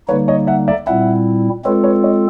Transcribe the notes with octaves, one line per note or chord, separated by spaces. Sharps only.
D3 G3 A#3 D#4 B4 C#5
C#5 D#5
E5 F#5
D5 E5
A#2 G3 C4 E4 E5 F#5
G#3 C4 F4 A4 B4 C#5
B4 C#5
C#5 D#5